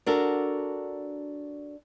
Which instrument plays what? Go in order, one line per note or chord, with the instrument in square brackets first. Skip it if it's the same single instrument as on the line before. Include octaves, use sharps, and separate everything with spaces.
[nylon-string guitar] D4 F#4 A4 A#4